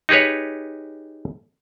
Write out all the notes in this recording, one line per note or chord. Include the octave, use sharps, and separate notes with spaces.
D#4 G4 G#4 B4 C#5